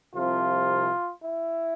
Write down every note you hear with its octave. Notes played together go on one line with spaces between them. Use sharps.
C2 C3 F3 F4
E4